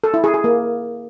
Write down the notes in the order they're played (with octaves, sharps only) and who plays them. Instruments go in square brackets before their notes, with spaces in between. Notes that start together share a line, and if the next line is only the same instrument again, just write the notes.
[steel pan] A4
E4
G#4
G#4
A#3